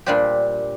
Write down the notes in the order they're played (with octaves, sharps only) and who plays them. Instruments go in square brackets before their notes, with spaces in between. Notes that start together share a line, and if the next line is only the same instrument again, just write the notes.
[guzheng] A#2 G3 D4 G4 C5